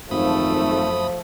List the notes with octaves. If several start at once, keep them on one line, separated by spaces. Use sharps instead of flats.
G#1 F#2 F3 A3 B5 D#6